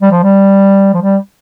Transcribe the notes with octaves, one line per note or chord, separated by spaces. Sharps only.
G3
F3
G3
F3
G3